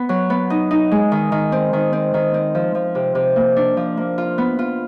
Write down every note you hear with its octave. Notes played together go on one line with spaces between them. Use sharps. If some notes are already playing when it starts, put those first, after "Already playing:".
Already playing: B3
F#3
B3
D#4
D#4
G#3
D#3
D#3
C4
D#3
C4
D#3
C4
F3
F3
C3
C3
A#3
D4
F3
A#3
F4
B3
F4